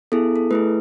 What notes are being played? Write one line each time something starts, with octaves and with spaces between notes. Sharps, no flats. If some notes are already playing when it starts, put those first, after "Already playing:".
B3 E4 G#4 A4
A4
A3 E4 G#4 B4